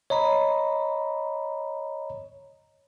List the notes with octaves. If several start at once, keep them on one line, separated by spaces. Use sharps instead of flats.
C#5 D#5 A#5 B5